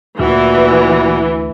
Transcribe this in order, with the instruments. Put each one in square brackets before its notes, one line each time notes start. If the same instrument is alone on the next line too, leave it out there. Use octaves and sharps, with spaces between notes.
[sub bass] D2 [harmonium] A#2 F#4 [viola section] E3